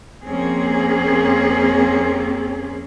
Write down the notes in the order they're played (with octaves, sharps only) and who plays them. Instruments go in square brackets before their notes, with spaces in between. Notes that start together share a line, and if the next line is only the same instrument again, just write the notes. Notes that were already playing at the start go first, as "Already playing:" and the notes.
[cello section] F2 A#3 C4 C#4 G#4